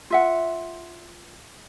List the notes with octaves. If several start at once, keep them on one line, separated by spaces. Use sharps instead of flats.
F4 E5 F#5